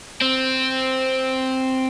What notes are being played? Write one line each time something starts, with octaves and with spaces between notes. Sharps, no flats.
C4